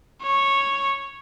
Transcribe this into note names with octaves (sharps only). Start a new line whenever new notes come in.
C#5